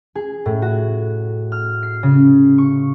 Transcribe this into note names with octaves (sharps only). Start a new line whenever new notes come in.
G#4
A2
F#4
F6
C7
C#3
C#6